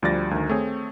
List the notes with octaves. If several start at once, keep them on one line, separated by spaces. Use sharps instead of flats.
D2 F3 G3 D5 A6 A#6
D2 D#3
A3 C4 G#4 C#5